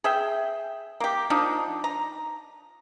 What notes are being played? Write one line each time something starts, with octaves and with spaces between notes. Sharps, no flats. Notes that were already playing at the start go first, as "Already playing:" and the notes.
G#4 E5 G5
A#3 G4
F3 D4 D#4
A#5